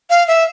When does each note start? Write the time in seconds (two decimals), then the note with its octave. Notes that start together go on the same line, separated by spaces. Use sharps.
0.10 F5
0.28 E5